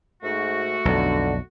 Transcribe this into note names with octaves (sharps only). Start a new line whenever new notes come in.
G#2 A3 F#4
B1 F2 D3